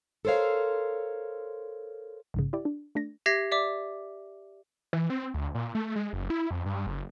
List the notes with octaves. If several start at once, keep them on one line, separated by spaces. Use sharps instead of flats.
A4 A#4 C5 C#5 F5
A#1 G#2 C#3
E4 G4 D5
D4
A3 D4 A#6
G4 E5 G#6 A#6 C7
D5 E5 D6
E3
C4
D2
A#2
A3
G#3
F#1
E4
F2
G2
F#1